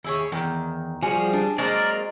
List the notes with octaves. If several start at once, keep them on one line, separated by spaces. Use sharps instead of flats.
D#2 E4 G#4 C#5
E2 D#3
F3 G3 F#4 G#4
D4
F#3 G#3 A#3 C4 A#4 D5